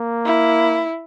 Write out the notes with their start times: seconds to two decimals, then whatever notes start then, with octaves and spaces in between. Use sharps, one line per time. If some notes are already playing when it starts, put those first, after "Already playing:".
Already playing: A#3
0.26 E4